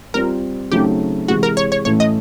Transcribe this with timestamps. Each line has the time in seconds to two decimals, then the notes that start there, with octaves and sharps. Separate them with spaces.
0.14 G3 C4 F4 A#4
0.72 C#3 F#3 A3 C4 D#4 G4
1.28 C3 E3 G#3 F#4
1.43 A#4
1.57 C#5
1.72 C#5
1.85 A2 E3 A3 C#4 C#5
2.00 D#5